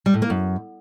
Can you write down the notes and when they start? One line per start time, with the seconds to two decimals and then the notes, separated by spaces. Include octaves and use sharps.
0.06 G3
0.14 A2
0.22 A#3
0.30 F#2